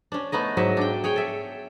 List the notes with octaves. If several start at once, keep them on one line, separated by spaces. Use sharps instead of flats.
C#4 D4
A3 B3 D#4 D#5
G#2 F#3 D#5 E5
D4 G5
G#4 C#5 G5
A4 E5